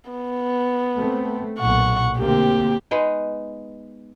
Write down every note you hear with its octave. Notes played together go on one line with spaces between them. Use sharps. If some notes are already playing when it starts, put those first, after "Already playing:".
B3
A3 C4
B1 A#2 F#5 C#6
D2 A#3 C4 G4
G#3 B3 D#4